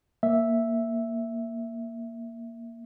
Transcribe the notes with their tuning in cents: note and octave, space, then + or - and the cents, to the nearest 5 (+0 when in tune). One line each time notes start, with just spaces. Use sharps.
A#3 +0 E5 +0